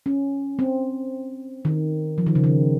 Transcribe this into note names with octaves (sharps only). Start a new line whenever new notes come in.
C#4
C4
D#3
F3
D#3
C#3
D#3